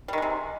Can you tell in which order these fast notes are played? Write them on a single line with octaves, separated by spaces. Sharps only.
G3 D#3 G#3 C3